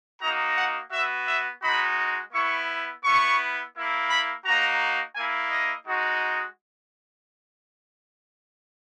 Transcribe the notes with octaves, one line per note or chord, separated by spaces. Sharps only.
A#3 D#4 F#4 A#5
F#5
B3 F#4 E5
E5
G#3 D#4 F#4 B5
B3 E4 C#6
B3 E4 C#6
A#3 E4
B5
A#3 D#4 F#4 A#5
A#3 E4 G#5
D#5
G#3 D#4 F#4